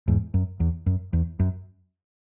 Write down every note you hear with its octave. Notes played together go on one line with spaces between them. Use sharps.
E2 G#2
F#2
E2
F#2
E2
F#2